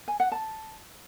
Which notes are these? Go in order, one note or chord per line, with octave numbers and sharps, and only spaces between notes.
G#5
F#5
A5